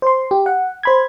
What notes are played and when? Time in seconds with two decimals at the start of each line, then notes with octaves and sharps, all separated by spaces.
0.02 C5 C6
0.31 G4
0.46 F#5
0.83 C5 B5 G#6